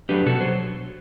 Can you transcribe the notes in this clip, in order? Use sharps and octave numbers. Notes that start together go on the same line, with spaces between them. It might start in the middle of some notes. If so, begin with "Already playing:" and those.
F#3 A3 D4 G4 B4
B2 F#4 A4
F#3 C5